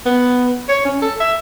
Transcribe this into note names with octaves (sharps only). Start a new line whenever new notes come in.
B3
C#5
C#4
A4
E5